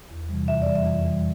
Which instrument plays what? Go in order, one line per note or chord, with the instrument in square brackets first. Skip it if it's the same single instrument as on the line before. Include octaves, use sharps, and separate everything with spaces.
[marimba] E2
C3 E3 G3
F2 E5
D5
E3 G3
E5
F2
E3 G3